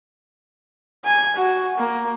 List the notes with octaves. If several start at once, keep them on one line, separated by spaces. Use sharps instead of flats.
G#5
F#4
A#3